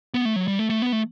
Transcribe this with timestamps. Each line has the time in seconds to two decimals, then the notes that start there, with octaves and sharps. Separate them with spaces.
0.14 B3
0.25 A3
0.36 F#3
0.48 G3
0.59 A3
0.70 A3
0.82 B3
0.92 A3